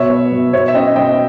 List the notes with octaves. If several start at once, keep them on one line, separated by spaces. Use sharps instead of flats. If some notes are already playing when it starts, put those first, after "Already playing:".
Already playing: B2 C#5 E5
B3
B2
B2 C#5 E5
E5
C#4 D#5 G5
B2 D#5 G5